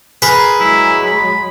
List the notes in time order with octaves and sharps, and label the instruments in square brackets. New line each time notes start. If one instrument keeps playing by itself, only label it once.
[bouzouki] G#4 A#4 [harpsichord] B4
[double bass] F#3 G#3 [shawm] E4
[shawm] B5